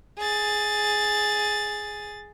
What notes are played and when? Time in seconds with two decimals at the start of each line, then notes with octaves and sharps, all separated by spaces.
0.18 G#4 A6